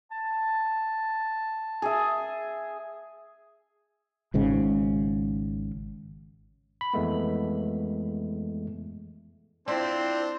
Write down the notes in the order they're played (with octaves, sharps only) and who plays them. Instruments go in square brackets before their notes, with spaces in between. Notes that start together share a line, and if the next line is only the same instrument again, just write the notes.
[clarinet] A5
[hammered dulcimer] G#4 E5
[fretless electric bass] G#1 G#2 C#3
[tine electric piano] B5
F2 E3 G#3 A3 B3
[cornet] C4 [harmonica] D4 C5 [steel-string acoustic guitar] E4 F4 D5